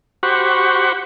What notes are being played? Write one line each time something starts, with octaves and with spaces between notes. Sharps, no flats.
F#4 G4 C5 F#5 B5 C#6